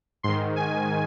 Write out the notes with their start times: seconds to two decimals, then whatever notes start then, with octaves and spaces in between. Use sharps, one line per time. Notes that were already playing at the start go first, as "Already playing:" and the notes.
0.23 G#2 D#3 C6
0.56 G#5